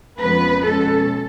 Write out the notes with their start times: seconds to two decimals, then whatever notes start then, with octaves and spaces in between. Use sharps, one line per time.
0.18 F2 C#3 F3 G#3 B3 B4
0.65 B2 G#3 C#4 A4